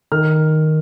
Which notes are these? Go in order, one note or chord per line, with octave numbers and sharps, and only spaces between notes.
D#3 F6